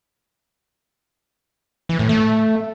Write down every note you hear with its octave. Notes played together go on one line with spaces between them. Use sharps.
E3
A2
A3